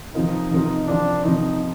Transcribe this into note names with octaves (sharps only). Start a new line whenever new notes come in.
C3 F3 C4 D#4 F4 A#4
C3 F3 C4 F4 A#4
C3 F3 C4 D4 F4 A#4
C3 F3 C4 D#4 F4 A#4